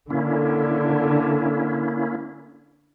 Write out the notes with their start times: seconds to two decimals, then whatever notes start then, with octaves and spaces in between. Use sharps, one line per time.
0.10 D3 A#3 C#4 E4